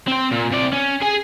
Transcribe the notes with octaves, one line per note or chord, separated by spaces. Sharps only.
C4 C5
A#2
C3 D5
C#4
G#4 G#5